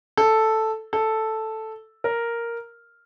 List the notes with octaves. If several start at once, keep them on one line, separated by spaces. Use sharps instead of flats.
A4
A4
A#4